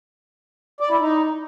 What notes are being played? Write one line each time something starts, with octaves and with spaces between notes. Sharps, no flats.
D5
E4
D#4